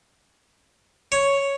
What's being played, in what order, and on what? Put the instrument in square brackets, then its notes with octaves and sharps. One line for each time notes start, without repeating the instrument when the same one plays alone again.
[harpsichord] C#5